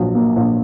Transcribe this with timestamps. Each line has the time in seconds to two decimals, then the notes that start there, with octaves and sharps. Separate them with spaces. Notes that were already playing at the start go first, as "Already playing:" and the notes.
Already playing: A#1 F#3
0.15 A#3
0.36 A#1